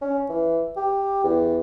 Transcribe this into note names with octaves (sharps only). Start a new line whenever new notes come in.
C#4
E3
G4
E2